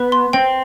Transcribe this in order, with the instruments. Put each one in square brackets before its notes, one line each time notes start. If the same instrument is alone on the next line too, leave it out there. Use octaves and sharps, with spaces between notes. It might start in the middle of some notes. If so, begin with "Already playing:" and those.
Already playing: [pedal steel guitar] B3 [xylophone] B4
[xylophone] C6
[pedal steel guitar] C4 [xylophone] G5